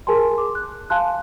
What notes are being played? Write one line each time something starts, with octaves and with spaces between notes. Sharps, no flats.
G#4 A#4 G#5 A5 C6
C6 D6
F#6
F5 G#5 A5 C6 F#6